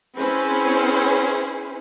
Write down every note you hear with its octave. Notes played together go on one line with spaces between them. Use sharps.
C4 C#4 E4 G#4 B4 C5